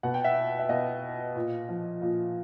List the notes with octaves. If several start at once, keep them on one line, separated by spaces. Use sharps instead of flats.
B2 F#5
G5
E5 F#5
E5
B2 D#5 F5
A#2
F3
A#2